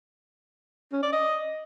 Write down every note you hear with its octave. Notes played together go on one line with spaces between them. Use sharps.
C#4
D5
D#5